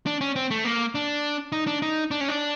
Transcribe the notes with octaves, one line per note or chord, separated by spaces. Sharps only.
D4
C#4
C4
A3
A#3
D4
D#4
D4
D#4
D4
C#4
D4